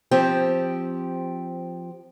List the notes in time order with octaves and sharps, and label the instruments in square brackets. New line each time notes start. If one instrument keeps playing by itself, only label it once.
[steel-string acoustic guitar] F3 C4 G4